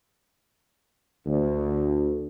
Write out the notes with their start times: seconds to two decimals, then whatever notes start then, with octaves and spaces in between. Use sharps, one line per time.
1.26 D2